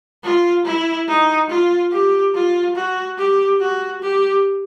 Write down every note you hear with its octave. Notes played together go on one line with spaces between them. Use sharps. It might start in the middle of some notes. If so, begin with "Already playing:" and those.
F4
E4
D#4
F4
G4
F4
F#4
G4
F#4
G4